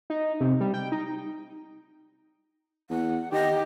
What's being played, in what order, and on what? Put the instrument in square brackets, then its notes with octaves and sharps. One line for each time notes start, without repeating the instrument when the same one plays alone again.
[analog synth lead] D#4
C3
G3
G5
D#4
[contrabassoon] E2 [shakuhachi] F#5
[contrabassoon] D#3 [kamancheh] G4 [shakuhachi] D#5